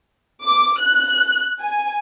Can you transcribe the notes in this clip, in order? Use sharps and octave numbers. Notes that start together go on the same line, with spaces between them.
D6
F#6
G#5